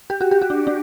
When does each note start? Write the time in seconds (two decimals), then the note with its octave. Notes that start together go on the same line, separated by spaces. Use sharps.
0.10 G4
0.21 F#4
0.31 G4
0.42 F#4
0.50 D4
0.67 D4